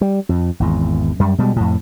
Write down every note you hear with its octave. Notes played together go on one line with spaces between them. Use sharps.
G3
F2
G#1 E2
F#2 G3
B2 G3 G#3
F2 A2